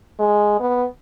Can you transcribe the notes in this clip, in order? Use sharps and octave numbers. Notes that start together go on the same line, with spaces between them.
G#3
B3